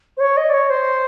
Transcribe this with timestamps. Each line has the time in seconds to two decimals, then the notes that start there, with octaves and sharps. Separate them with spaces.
0.17 C5
0.20 C#5
0.37 D#5
0.50 D5
0.53 C#5
0.70 C5